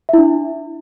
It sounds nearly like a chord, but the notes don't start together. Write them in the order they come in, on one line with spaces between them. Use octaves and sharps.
E5 E4 D4